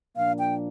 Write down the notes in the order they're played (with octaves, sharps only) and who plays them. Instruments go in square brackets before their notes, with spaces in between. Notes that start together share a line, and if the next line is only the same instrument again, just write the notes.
[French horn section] A#2 F3 A#3 D4 [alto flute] F5
[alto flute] G5